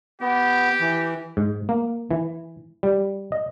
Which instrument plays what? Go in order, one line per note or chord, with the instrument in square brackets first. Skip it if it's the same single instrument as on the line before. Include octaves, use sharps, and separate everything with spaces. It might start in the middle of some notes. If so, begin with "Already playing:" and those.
[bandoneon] B3 [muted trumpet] G4
[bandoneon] E3
[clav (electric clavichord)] G#2
A#3
E3
G3
D#5